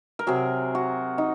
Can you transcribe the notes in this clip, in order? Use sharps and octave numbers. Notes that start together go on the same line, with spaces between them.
A#4
C3 F#3 G#4
F#4
D#4